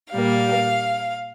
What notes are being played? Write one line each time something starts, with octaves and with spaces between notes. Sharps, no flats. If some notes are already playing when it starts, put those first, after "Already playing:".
A#2 G3 A#3 F5